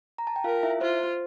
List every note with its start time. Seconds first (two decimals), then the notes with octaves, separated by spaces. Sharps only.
0.18 A#5
0.27 A5
0.36 G5
0.44 F4 A#4 F5
0.63 E4 E5
0.81 F4 C5
0.99 C5